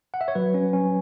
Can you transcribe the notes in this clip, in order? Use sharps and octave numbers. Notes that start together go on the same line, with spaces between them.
F#5
E5
C#5
F#3 B4
C#4
C#4